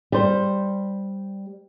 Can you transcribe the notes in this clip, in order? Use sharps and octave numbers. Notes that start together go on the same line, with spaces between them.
G3 C5